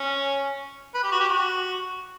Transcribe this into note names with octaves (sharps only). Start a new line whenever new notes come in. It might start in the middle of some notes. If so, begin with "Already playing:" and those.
Already playing: C#4
B4
G4
F#4
G4
F#4